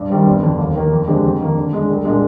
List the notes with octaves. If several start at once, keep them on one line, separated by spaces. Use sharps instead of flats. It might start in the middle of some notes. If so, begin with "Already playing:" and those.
Already playing: G2
D#3 G3 C4
G1
F2 D3
D#2
D#3 A#3
F2
D3 G#3 C4 G4
F2
D#3 A#3
D3
G#3 D4
C2
A#2 G#3 D4